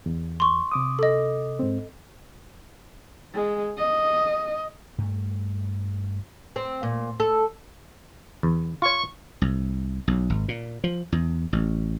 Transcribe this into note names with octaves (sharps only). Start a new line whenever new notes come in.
E2
C6 C#6
C3 D6 D#6
A4 D#5
G#2 C4
G#3
D#5
G2 A3
C4
A#2
A4
E2
F4 C#5 C#6
C2
B1
G#1
A#2
F3
E2
A1